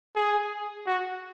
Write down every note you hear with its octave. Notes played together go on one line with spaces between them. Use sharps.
G#4
F#4